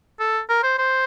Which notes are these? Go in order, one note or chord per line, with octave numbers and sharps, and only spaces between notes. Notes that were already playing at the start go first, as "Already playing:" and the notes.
A4
A#4
C5
C5